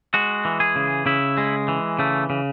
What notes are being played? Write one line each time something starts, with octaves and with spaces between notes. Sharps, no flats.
G#3 F#4
E3
G#4
C#3
C#3 E4
G#3
E3
C#3 A3
C#3